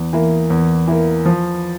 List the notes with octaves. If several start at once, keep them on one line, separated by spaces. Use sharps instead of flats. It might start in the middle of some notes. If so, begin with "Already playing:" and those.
Already playing: E2
E3 A#3
E2
E3 A#3
F3